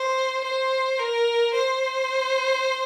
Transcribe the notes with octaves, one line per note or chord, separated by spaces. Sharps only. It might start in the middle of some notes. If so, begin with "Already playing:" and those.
Already playing: C5
C5
A#4
C5